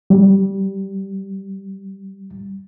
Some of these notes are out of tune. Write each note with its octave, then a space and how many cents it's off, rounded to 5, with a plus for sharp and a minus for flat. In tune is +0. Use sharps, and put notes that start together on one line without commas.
G3 -10